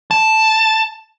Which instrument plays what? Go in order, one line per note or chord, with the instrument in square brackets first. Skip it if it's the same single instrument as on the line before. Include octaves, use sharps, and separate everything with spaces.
[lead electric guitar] A5